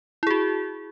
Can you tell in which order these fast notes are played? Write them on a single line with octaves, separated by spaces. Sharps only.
E4 G#4 F#4